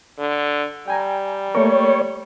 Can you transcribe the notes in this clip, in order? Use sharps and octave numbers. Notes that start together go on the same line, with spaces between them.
D3
G3 G5 G#5 A#5
A3 A#3 A#4 C#5